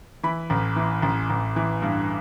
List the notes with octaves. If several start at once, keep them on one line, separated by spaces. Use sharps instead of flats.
E3 B5
A1
E3
A1
A1
E3
G2